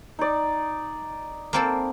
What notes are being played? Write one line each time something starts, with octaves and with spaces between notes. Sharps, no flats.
D#4 D5
A#3 C4 A4